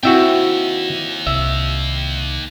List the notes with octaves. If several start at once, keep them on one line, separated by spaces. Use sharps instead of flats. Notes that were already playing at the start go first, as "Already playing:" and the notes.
D#2 C4 E4 F#4 E5 G5
C2 E5